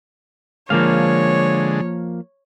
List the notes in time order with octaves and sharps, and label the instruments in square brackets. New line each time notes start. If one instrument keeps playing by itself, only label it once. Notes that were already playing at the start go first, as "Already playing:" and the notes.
[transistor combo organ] D3 G#3 [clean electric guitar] F3 A#3 F5 [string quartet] C#5